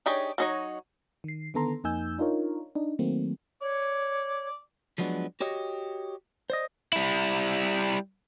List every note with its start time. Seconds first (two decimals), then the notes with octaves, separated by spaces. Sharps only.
0.06 D4 D#4 G4 G#4 C#5
0.38 F#3 D#4 C#5
1.24 D#3 C7
1.54 D3 D#3 B3 A4 A#5 C6
1.84 F2 A#3 D#4 G#5 E6 G6
2.19 D4 D#4 F4 A#4 C#5
2.75 D4 D#4
2.99 D#3 F#3 A3 A#3 C4
3.61 C#5 D5
4.98 F3 F#3 G#3 B3 D4
5.40 F#4 G4 C#5 D#5
6.50 C5 D5 D#5
6.93 G3 E4